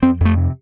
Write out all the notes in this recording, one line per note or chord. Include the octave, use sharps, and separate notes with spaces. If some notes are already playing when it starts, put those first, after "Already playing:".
F2 C4
F2 A3
C3